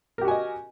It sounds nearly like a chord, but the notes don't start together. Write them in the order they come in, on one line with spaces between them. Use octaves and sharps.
A#4 G4 F#4 G#5 D#5